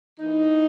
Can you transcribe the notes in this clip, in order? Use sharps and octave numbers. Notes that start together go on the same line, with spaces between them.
E3 A#3 D#4